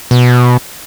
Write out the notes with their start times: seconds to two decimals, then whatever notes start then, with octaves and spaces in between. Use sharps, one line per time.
0.11 B2